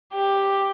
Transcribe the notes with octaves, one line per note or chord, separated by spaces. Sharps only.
G4